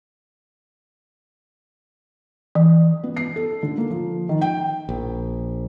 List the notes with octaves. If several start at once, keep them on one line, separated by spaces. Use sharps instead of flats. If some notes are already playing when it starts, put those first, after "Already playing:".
E3
B3
C7
A4
D3
A#3
F3
D#3
G5
A#1